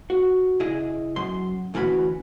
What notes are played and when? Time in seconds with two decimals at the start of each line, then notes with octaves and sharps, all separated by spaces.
0.10 F#4
0.60 C#3 E4 G#4 D#5
1.16 F#2 C6
1.74 D2 E3 C#4 F#4 B5